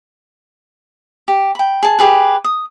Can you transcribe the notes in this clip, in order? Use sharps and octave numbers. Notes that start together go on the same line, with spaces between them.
G4
G5 B5
G#4 A5
G4 G#4 B4
D#6